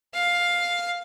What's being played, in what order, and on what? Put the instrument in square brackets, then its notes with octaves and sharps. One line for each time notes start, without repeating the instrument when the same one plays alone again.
[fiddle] F5